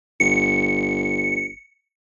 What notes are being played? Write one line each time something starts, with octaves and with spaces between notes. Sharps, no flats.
G1 C#7